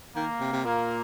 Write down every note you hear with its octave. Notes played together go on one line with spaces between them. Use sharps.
D#3 A#3
C3
C3
A#2 A#3